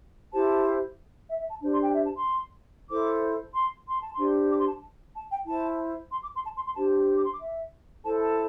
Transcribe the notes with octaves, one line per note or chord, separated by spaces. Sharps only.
E4 G4 C5 A5
E5
E5
A5
D4 G4 C5
C6
G5
E5
A5
C6
E4 A4 C5 D6
C6
C6
A5
C6
D4 G4 C5
D6
C6
A5
A5
G5
E4 C5 A5
C6
D6
C6
A5
C6
C6
D4 G4 C5 A5
D6
C6
D6
E5
E4 A4 C5 A5
A5